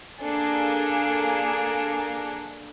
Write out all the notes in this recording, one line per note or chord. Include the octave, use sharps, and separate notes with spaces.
A#3 D4 G#4 A4